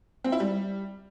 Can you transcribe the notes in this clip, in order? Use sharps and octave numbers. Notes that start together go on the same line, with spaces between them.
C4
E4
G3